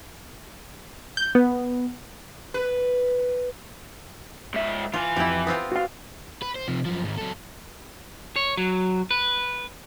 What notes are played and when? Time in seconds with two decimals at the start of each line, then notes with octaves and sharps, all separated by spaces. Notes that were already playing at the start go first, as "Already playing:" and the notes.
1.17 G6
1.35 B3
2.54 B4
4.54 G#2 E5
4.94 E3 F4 G#5
5.16 F2 E4 G4
5.47 B3 C4 F4
5.72 F#4 F5
6.43 B4
6.56 C5
6.68 C3 F3
6.85 F#2 F3
7.04 G#2 D#3
7.18 F#3 A4
8.36 C#5
8.57 F#3
9.11 B4